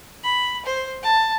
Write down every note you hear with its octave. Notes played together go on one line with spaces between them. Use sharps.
B5
C5
A5